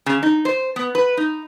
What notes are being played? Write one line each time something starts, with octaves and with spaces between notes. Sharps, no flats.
C#3
D#4
C5
B3
B4
D#4